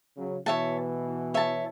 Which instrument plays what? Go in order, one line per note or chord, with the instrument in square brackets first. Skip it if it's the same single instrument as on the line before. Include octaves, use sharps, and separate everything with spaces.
[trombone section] C#3 F#3
[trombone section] B2 E3 [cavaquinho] C#5 E5 A5
[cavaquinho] C#5 E5 A5